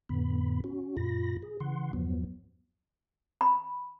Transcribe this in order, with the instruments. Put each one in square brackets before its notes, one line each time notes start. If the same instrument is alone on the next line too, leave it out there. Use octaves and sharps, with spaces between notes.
[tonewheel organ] F2 A2 D3 B3 B5
C#4 F#4
F#2 A#2 F4 B5 A#6
G#4
C#3 E3 F#5 C6
E2 G2 F3 F#3 B3
[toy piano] B5